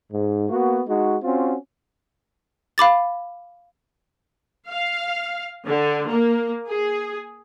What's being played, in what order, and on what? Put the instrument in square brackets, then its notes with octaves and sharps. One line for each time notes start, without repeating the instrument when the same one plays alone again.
[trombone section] G#2
A#3 B3 F#4
G#3 D#4 F#4
C4 C#4 F4 F#4
[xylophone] F5 B5 D6 A6
[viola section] F5
D3
A#3
G#4